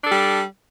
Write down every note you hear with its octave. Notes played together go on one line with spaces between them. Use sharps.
G3 D4 A4